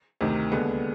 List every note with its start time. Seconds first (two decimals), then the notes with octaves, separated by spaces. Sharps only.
0.21 D2 C3 D#3
0.52 D#2 D3 G#3 B3